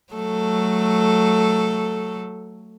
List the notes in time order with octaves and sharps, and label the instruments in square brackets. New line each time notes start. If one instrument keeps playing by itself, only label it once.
[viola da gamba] F#3 A3 A4